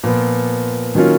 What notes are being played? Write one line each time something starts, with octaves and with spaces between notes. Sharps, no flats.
A#2 F3 B3
D#3 F#3 A#3 C#4 F4